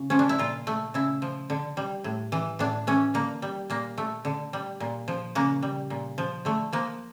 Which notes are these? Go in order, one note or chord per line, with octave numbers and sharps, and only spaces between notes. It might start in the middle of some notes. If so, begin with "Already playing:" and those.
Already playing: C#3
F3 C#4
D4
E4
A#2 F4
A3
C#3 E4
F3
D3
G3
A2
E3
A2 D4
E3 C#4
D3 A#3
G3
A#2 A#3
A3
D3
G3
A#2
F3
C#3 A#3
G3
A#2
F3
D3 A3
F3 A#3